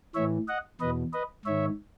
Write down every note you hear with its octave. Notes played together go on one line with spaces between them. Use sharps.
A2 E3 C#5 E5
D#5 F#5
E2 B2 B4 D#5
B4 D#5
G#2 D#3 C#5 E5